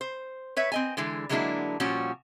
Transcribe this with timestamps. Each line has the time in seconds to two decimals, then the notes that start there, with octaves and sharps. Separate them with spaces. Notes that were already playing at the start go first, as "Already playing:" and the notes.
0.01 C5
0.57 B4 C#5 E5
0.72 C4 D#5 G#5
0.97 D3 E3 G#3
1.29 D3 F#3 G#3 A#3 D4 E4
1.80 A#2 F3 G3 C#4 F#4